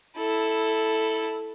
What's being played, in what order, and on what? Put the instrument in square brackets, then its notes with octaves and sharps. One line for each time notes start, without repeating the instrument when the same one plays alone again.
[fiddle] E4 A4